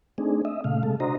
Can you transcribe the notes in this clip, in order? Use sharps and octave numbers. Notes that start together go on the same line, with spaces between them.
A3 C4 D4 D#4 G#4
D#5 E5
A#2 C#3 A3 F5
C3 G#3 A4
D4 F#4 C5 D#5 A#5